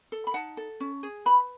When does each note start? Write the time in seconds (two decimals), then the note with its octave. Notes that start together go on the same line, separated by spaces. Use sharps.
0.12 A4
0.27 B5
0.34 D#4 F#5 A5
0.57 A4
0.80 C#4
1.03 G#4
1.26 B4 B5